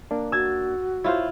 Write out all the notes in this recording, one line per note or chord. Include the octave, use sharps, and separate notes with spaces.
A#3 D4
F#4 E6 G#6 A6
E4 F4 C5 C#5